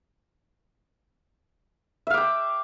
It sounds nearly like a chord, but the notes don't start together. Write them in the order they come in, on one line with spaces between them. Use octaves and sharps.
E5 F5 D6 G5